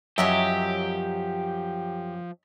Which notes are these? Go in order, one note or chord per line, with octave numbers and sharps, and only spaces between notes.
F#2 F3 F#3 G4 C#5 D#5 E5